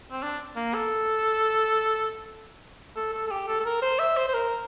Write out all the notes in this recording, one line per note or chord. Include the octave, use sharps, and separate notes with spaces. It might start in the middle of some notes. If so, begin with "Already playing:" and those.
C4
D4
A#3
A4
A4
A4
A4
G4
A4
A4
A#4
C5
E5
C5
C5
A#4